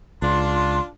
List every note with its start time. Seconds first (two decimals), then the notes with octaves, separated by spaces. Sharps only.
0.22 C#2 D4 F4 C6